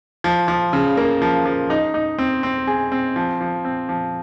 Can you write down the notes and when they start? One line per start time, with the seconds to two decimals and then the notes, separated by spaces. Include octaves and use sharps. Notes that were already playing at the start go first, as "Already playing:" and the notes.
0.24 F3
0.48 F3
0.73 C#3
0.97 A#3
1.22 F3
1.45 F3
1.70 D#4
1.94 D#4
2.19 C4
2.43 C4
2.67 G#4
2.92 C4
3.16 F3
3.41 F3
3.65 C4
3.89 F3